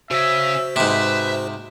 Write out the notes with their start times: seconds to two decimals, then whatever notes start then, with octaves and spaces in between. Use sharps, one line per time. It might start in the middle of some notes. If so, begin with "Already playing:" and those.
0.11 C#3 C#4 F#4 C5 E5
0.76 G#2 C3 B4 E5